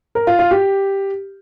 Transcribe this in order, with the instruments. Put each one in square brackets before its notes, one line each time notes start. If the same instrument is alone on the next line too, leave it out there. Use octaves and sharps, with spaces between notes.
[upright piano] A#4
F4
F4
G4